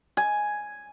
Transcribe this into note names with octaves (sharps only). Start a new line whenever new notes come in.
G#5